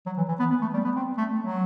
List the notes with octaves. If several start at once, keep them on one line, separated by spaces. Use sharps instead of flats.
F#3
E3
E3
B3
B3
A3
G3
B3
C4
A3
F#3